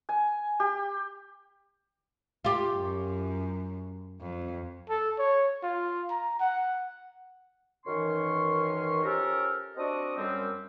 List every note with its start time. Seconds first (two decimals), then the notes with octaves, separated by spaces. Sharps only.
0.09 G#5
0.60 G4
2.45 F4 G4
2.75 F#2
4.21 F2
4.89 A4
5.19 C#5
5.63 F4
6.11 A#5
6.40 F#5
7.86 F#2 D#3 E3 C#4 C6 C#6
9.03 F3 C#4 G4 A4 A#4
9.77 C4 D4 F#4 A4 D#5 D#6
10.17 F#2 G3 C4